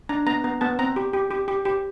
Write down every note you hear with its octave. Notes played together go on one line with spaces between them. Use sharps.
D4 A#5
B3 A#5
B3 A#5
B3 A5
C4 A#5
G4
G4
G4
G4
G4